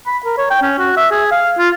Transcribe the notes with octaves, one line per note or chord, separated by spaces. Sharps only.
B5
A#4
C#5
G5
C#4
F#4
E5
G#4
F5
F4